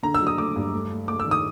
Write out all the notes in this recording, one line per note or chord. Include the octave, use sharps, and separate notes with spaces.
D3 A#5
E6
F#3
D#6
A3 D6
G2
A3
A3
A3 D6
E6
D#3
D#6